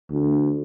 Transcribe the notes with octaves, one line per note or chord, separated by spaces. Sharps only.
D2